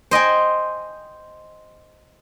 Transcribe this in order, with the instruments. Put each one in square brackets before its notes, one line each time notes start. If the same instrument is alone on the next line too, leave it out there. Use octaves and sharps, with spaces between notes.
[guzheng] C5 D#5 G5 G#5